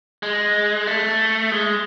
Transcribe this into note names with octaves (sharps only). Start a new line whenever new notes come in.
G#3
A3
G#3